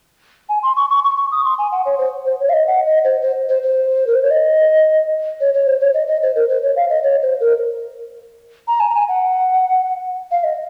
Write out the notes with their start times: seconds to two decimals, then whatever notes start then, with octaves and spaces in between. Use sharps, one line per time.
0.49 G#5
0.63 C6
0.76 C#6
0.90 C#6
1.04 C#6
1.17 C#6
1.32 D#6
1.45 C6
1.58 G#5
1.72 F#5
1.86 C#5
1.99 C5
2.26 C5
2.40 C#5
2.49 F5
2.53 D#5
2.67 F#5
2.86 D#5
3.04 C5
3.22 C5
3.49 C5
3.63 C5
4.07 A#4
4.16 C5
4.23 C#5
4.31 D#5
5.41 C#5
5.54 C#5
5.67 C5
5.81 C#5
5.94 D#5
6.08 D#5
6.22 C5
6.36 A#4
6.49 C5
6.62 C#5
6.76 F5
6.90 D#5
7.03 C#5
7.22 C5
7.41 A#4
8.68 A#5
8.80 G#5
8.90 A#5
8.94 G#5
9.09 F#5
10.31 F5
10.44 D#5